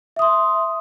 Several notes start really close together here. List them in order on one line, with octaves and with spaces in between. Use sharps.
E5 D#6 C6